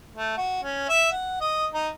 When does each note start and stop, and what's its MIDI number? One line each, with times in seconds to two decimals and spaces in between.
0.16 0.34 57
0.37 0.60 66
0.63 0.84 61
0.89 1.08 76
1.12 1.37 78
1.40 1.66 75
1.74 1.88 63